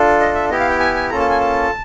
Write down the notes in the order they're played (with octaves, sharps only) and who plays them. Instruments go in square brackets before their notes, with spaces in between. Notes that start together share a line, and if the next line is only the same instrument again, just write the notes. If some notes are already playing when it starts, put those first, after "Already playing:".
Already playing: [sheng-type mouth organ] D4 F4 A4
D#5
E5
B3 E4 G4 D#5
F5
G5
G#5
G#5
A#3 C#4 F4 A4 A#5
A5
G#5
A5